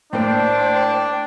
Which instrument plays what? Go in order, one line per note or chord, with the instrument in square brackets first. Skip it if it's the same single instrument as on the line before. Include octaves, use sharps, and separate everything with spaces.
[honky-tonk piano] A2 A#3 [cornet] D4 [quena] C5 [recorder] G5